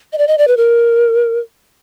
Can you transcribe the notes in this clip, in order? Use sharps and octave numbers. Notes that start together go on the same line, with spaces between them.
D#5
D5
D#5
D5
B4
A#4